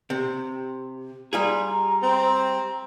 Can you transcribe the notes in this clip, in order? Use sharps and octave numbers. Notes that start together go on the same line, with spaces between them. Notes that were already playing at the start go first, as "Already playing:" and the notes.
C3
G3 F4 G#4 A#5
C4